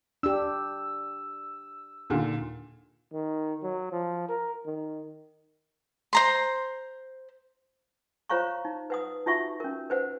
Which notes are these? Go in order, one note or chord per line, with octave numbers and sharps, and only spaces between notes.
D4 G4 E6
D#2 A#2 D3
D#3
F#3
F3
A#4
D#3
C5 A#5 C6
F4 C5 C#5 F5 A#5 C#6
D#4
B4 F#5 D#6
D#4 F4 F#4 E5 F#5 C#6
C#4 A#4
B4 C5 F#5